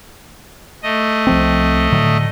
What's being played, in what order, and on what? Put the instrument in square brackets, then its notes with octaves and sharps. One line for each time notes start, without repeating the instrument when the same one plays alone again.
[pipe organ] A3 D#5
[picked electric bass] C2 F3 C4
A2 D3 F#3